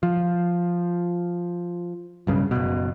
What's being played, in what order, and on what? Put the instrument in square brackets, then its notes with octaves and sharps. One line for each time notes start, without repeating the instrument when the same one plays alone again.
[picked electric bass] F3
B1 G2 C#3
F#1 B2